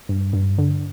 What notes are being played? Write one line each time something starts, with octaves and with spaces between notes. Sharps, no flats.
G2
G2
D3